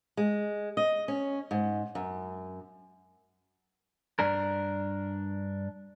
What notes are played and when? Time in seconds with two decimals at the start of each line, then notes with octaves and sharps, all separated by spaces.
0.17 G#3
0.77 D#5
1.08 C#4
1.51 G#2
1.95 F#2
4.19 G2 D4 A#4